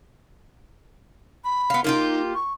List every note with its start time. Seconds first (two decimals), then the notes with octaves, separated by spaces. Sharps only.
1.44 B5
1.70 B3 F4
1.84 A#3 D#4 F4 G4
2.35 C#6